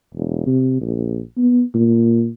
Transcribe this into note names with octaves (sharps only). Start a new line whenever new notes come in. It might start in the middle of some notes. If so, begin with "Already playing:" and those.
E1
C3
A#1
B3
A#2